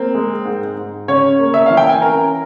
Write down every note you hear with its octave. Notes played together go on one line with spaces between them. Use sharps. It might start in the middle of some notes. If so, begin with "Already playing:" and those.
Already playing: A#3 C4
G#3
G#2
G#2
C#3 C#4 C#5
A#3
E5
E3 F5
G5
G#5
C#4 A#4 A#5